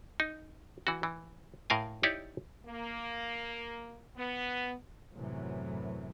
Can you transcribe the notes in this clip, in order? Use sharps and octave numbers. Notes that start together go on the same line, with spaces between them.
D#4
E3 F#4
E3
A2 A#4 F5 G#5
D#4 E4 G4 C#5 D5
A#3
B3
F#2 A2 C3 E3 F#3